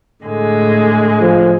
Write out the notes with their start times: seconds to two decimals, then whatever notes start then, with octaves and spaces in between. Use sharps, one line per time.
0.24 A2 D3 G#3
1.21 F3